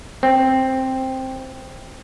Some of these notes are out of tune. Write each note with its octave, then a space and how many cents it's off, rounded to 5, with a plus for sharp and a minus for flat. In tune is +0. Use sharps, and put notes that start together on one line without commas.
C4 +5